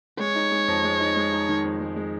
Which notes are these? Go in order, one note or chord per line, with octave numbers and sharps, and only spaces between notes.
G#3 C#5
D#4
G#3
F2
G#3
D#4
G#3
D#4
D#3
F2
G#3
G#3